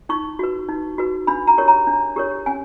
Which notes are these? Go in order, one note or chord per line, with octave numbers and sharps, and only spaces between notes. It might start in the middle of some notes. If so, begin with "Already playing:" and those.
D#4 C#6
F#4 B4
D#4
F#4 B4
D4 B5
A#5
G4 A#4 C#5
A#5
D4
G4 A#4 C#5
C#4 G#5